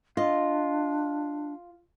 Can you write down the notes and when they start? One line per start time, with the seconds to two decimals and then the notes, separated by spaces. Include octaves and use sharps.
0.17 D4 F4 D#5